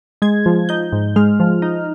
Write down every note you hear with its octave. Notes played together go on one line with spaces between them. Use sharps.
G#3 G#6
F3
D#4 G6
G#2
G#3 F6
F3
D#4